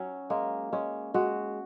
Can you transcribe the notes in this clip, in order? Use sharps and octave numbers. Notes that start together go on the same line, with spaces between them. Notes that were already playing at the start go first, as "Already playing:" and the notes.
Already playing: F#3 C#4
G#3 A#3
G#3 C#4
G#3 F#4